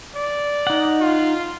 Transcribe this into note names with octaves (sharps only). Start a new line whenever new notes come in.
D5
D#4 F#5
F4